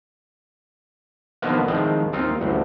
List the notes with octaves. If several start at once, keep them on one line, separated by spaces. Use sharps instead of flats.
B2 D3 D#3 F3 A#3 B3
A2 D#3 F3 G#3 C4
D#2 C4 D#4 F4
A1 D2 G2